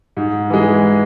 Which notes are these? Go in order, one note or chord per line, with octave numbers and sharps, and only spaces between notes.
G#2
E3 G#3